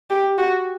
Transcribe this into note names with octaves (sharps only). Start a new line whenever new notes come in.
G4
F#4